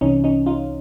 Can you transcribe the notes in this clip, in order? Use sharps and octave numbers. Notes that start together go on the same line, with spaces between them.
C2 C3 E3 C#4 D#4
C#4 D#4
D#4 F4